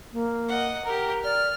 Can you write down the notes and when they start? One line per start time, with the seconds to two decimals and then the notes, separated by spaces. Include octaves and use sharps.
0.13 A#3
0.48 D#5 F#5
0.85 G4 A#4 A#5
1.24 D5 F6